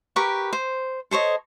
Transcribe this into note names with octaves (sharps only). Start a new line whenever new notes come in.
G4 A#4 B4 C#6
C5
A4 C5 C#5 D#5